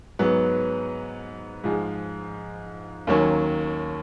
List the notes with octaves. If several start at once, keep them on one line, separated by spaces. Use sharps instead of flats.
G#2 F#3 B3
G#2 F3 G#3
D#2 D#3 F#3 A#3 C#4